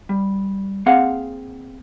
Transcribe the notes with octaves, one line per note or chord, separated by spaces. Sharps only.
G3
A#3 C4 G#4 F5 F#5